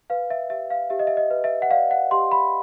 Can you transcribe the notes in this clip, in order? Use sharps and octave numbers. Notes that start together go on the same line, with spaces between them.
B4 F5
E5
G4 E5
F5
G4 E5
D#5
E5
D#5
B4
E5
F#5
D5 F5
F#5
G4 C6
B5